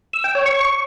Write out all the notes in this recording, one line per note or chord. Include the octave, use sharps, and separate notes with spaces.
E6
G5
C#5
C#6